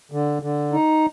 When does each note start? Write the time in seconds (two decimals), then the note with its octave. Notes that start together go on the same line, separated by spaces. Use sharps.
0.12 D3
0.42 D3
0.72 D#4